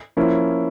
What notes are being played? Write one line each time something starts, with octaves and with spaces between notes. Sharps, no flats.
F3 A#3 C#4 E4